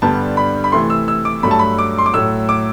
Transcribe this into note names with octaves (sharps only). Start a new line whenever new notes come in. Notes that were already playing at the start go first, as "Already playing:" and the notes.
G2 D3 G3 B3 A5
B5
B5
C3 E3 A3 C6
E6
E6
D6
G2 F#3 A3 B5
A5
B5
D6
C6
D6
A2 F#3 A3 E6
D6